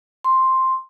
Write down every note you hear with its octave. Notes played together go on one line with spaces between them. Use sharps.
C6